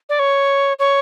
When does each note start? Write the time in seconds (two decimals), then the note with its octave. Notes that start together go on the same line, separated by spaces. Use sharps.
0.09 D5
0.19 C#5
0.79 C#5